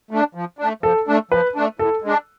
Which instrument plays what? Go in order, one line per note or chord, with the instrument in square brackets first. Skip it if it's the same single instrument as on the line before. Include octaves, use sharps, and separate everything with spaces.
[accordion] A3 D4
F3
A3 D4
[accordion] F3 [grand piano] A4
[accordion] A3 D4
[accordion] F3 [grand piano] B4
[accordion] A3 D4
[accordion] A2 [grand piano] A4
[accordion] G#3 D4